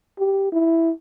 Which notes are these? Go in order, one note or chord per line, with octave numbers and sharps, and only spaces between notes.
G4
E4